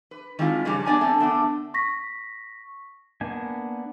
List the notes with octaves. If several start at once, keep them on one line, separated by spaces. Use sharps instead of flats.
B4
D#3 G#3 C4 E4 F4
G2 C#3 F3 G3
B3 D4 D5 G#5 A#5
A3 C4
D3 A3 B3
C#6 A#6 B6
A#3 B3 D4 G#5